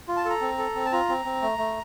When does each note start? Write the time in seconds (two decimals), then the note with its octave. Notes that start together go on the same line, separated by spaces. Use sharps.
0.08 F4
0.16 A5
0.25 A4 A#5
0.41 C4
0.58 A4
0.75 C4
0.85 A5
0.92 F4 A#5
1.09 C4
1.25 C4
1.42 A3
1.58 A3